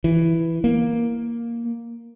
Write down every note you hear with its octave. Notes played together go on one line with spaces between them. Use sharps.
E3
A#3